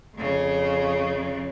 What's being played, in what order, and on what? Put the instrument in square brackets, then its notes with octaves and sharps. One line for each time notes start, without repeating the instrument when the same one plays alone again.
[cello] F2 C#3